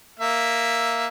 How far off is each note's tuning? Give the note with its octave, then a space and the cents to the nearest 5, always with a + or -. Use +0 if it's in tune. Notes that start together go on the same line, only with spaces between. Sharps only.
A#3 +0 E5 +0